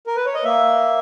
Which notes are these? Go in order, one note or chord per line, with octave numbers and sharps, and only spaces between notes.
A#4
B4
C#5
D#5
A#3 E5